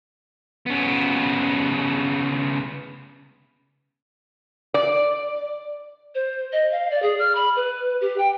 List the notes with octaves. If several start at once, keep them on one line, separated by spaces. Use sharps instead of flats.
C#3 B3
D5
C5
D#5
F5
D5
G#4
F6
B5
B4
G4
G5